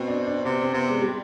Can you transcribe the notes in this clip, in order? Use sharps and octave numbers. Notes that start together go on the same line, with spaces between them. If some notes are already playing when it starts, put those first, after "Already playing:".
Already playing: B2 C4
D4
D4
C3 B3
C4
C3 B3
G#3
G3